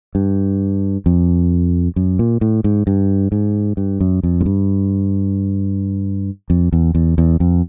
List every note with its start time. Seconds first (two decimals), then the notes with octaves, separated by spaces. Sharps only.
0.15 G2
1.06 F2
1.96 F#2
2.19 A#2
2.41 A2
2.64 G#2
2.87 G2
3.32 G#2
3.77 G2
4.00 F#2
4.23 F2
4.41 G#2
4.46 G2
6.50 F2
6.72 E2
6.95 E2
7.18 E2
7.40 F2